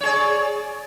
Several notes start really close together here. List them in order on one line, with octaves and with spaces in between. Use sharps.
C#5 G#4 D5